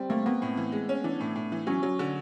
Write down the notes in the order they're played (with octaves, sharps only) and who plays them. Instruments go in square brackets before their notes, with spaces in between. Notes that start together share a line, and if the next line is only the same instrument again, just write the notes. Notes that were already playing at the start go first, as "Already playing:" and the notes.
Already playing: [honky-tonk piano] G3 [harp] C4
[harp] A3 [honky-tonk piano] A#3
[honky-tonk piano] A#3 [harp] B3
[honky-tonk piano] A2
E3
G#3
C#4
[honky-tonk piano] E3 [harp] D4
[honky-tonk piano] A2
A2
E3
[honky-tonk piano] F#3 [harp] C#4
[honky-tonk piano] F#3
D3